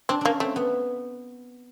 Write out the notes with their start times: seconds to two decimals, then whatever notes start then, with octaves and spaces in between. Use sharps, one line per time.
0.09 C4 D4
0.21 A#3 C#4 D4
0.40 A3 C4
0.56 B3